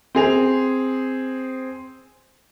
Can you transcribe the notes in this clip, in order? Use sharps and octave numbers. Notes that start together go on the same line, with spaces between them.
C4 G#4 F7